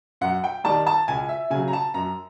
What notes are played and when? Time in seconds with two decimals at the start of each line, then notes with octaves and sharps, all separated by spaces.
0.21 F#2 F#5
0.44 G5
0.64 D#3 G3 A5
0.87 A5
1.08 C#2 G#5
1.29 E5
1.50 C#3 F#3 G#5
1.68 A#5
1.73 A5
1.94 F#2 A#5